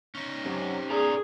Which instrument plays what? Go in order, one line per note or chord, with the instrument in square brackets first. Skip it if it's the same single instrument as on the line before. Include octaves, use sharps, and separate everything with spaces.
[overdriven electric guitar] C#4 D#4
[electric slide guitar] F#2 [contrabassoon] C3
[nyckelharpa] G#4 [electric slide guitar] A#4 D5 A#5